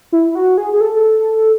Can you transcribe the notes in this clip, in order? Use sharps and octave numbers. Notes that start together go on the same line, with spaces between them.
E4
F#4
G#4
G#4
A4